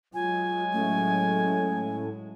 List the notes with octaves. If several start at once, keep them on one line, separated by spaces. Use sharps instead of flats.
F#3 G#3 F4 G#5
A2 A3 C#4